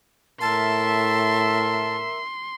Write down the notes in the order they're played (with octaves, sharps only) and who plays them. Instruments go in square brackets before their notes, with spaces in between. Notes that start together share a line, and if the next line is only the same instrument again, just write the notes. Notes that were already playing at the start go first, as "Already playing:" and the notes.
[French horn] A2 [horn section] A#4 E5 [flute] A5 [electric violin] C6